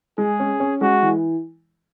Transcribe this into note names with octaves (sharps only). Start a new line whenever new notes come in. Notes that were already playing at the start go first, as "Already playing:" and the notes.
G#3 G#4
C#4
C#4
G#3 F#4
E3